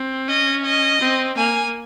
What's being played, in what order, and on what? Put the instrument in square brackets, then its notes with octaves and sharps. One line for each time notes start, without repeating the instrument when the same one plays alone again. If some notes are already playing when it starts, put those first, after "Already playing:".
Already playing: [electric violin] C4
[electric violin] C#4 [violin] D#5
[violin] D#5
[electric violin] C4
[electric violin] A#3 [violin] G#5